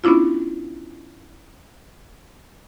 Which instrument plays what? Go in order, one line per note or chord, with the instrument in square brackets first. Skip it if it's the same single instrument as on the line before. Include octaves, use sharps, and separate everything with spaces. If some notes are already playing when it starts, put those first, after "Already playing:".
[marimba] B3 C#4 D4 E4 F4